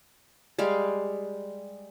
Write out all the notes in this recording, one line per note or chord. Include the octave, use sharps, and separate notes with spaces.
G3 G#3 F5